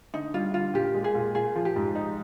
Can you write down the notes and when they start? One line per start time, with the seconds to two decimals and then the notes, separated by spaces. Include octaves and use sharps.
0.14 D3 D#4
0.34 G3 F4
0.54 D3 F4
0.74 A#2 G4
0.94 G#3
1.04 G#4
1.15 A#2
1.35 F4 G#4
1.56 F3
1.65 G4
1.76 G#2
1.95 D#4